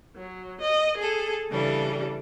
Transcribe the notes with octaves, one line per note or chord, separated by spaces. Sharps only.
F#3
D#5
G#4 A4
C#3 E3 G3 D4 A4